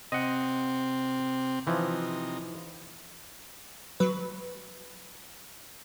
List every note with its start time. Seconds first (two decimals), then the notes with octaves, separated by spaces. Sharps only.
0.12 C3 C4 D#5 F#5
1.67 C3 E3 F3 D#4
4.00 F#3 B4